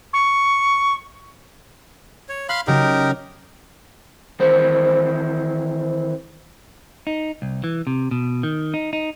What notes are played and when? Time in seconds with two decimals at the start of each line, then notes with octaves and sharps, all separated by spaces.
0.13 C#6
2.29 C#5
2.49 F5 B5 C6 F#6
2.67 C#3 F#3 D#4 G4 A#4
4.39 D#3 E3 C4 C5
7.07 D#4
7.42 C2
7.64 E3
7.87 C3
8.11 B2
8.43 D#3
8.74 D#4
8.93 D#4